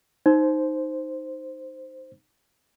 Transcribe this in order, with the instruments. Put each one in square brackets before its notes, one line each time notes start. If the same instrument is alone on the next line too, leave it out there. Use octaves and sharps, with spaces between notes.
[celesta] D#4 [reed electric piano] C5